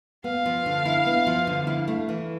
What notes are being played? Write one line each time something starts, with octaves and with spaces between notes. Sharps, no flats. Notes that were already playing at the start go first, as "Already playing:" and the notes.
B3 F5
F3
D3
E4
B3
F3
D3
E4
A3
E3